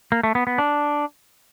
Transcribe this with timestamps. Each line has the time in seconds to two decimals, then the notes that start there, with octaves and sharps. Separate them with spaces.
0.12 A#3
0.23 A3
0.35 B3
0.47 B3
0.58 D4